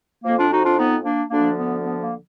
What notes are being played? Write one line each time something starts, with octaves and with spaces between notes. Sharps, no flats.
F2 F3 A#3
D4 F4
D#4 F#4
D4 F4
B3 D#4
A#3 D4
D2 D3 F3 A#3 D4
B3
B3
A#3